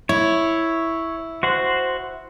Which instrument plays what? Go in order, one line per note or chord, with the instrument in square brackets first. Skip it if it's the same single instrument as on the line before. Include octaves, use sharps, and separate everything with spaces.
[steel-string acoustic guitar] E4 [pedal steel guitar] C#5
[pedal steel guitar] F#4 C5 F#5